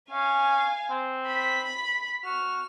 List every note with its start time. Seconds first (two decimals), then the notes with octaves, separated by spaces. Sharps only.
0.11 C#4 F5 G#5
0.91 C4
1.27 B5 B6
2.25 F#4 F6